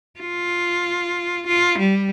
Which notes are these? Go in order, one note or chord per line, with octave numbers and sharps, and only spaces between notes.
F4
F4
G3